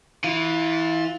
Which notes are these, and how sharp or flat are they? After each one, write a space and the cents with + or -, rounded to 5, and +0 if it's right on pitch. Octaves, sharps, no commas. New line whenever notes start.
E3 -15 F4 +15